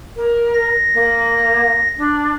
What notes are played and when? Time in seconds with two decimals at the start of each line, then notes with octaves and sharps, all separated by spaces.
0.16 A#4
0.54 A#6
0.94 A#3
1.98 D4